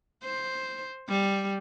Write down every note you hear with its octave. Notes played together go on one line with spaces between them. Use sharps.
C5
G3